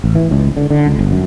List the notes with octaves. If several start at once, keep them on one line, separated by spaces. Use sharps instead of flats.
A1
E3
C#2
D3
D3
C#2
G1
F#2